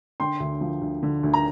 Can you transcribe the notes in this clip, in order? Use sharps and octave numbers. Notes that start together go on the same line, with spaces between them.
D3 G5 C6
D2
F3
D2
D3
D2
A#5